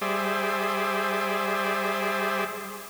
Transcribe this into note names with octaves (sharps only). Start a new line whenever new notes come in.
G3 G#4 C5 D5 E5